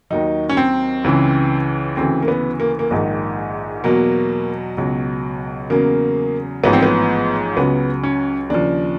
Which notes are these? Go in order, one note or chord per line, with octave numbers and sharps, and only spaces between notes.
D#2 D#3 F#3 D#4
C#4
C4
C#2 C#3 E3
D2 C#3 E3 C4
A#3
B3
A#3
A#3
A#1 G#2 D#3
E2 B2 F#3 A#3
C#2 B2 F#3
E2 C#3 F#3 A#3
A1 G#2 F3 B3
C4
B3
C#2 C#3 F#3 B3
C#4
D#2 C#3 F3 D4